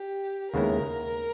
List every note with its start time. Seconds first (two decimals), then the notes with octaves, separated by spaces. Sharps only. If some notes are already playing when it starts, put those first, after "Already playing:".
Already playing: G4
0.53 D#2 C#3 G#3 B3 E4 A#4